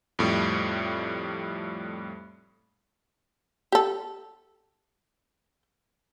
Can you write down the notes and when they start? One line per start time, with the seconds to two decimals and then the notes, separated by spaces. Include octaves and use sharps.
0.19 F2 A2 G3
3.72 G4 A4